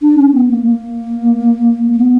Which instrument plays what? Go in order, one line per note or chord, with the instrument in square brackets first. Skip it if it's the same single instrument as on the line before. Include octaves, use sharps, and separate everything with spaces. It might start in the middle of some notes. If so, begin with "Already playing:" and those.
[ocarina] D4
C#4
B3
A#3
A#3
A#3
B3